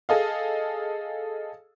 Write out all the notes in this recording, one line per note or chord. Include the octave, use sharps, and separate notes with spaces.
G#4 A4 D#5 F5